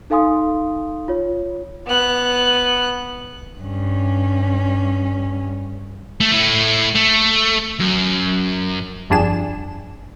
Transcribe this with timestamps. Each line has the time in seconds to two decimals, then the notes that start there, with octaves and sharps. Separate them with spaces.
0.10 D#4 A4 F5 G#5 C6 D#6
1.08 F4 C#5
1.87 B3 F#6
3.61 G2 C#4
6.20 A3
6.32 A3 E4
6.95 A3
7.80 F#2
9.10 G1 F2 G3 D4 G#4 E7